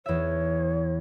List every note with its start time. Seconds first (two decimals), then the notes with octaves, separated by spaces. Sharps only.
0.06 E2 C#5 E5